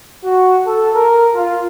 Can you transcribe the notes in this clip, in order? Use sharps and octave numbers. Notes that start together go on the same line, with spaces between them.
F#4
A4
A#4
F4